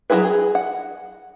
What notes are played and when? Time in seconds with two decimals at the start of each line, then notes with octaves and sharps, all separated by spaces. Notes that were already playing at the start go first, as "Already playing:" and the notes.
0.10 F#3 C4 E4 G#4 B4
0.25 G#4
0.55 F#5